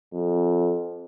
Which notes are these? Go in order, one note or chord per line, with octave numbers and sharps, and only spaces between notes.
F2